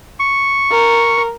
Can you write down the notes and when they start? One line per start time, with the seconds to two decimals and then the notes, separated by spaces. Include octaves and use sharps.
0.20 C#6
0.71 A#4